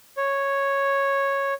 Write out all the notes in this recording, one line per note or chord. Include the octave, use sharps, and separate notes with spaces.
C#5